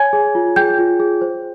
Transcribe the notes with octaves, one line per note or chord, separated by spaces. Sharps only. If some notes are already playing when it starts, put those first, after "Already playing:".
Already playing: C#5 G#5 G#6
G#4
F4
G#4 G5 G6
F4
G#4
C5